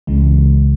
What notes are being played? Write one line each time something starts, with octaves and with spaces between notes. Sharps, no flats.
C#2 C#3 E3 G#3